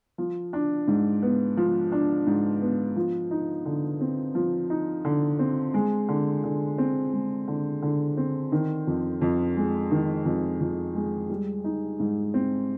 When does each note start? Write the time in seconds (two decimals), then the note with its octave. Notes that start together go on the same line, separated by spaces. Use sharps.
0.18 F3
0.53 D4
0.88 G#2
1.22 B3
1.57 F3
1.92 D4
2.27 G#2
2.61 B3
2.96 F3
3.31 D#4
3.65 D3
4.01 C4
4.35 F3
4.70 D#4
5.05 D3
5.39 C4
5.74 G#3
6.08 D3
6.44 D3
6.78 C4
7.13 G#3
7.48 D3
7.82 D3
8.17 C4
8.52 D#3
8.87 F2
9.21 F2
9.57 G#3
9.91 D#3
10.25 F2
10.61 F2
10.95 G#3
11.30 G3
11.64 D#4
12.00 G#2
12.34 C4